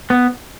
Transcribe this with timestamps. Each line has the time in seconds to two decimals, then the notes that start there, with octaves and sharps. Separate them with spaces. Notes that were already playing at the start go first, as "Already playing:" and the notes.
0.10 B3